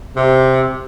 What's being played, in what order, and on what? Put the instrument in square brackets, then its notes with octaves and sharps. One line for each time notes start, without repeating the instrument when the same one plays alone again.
[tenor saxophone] C3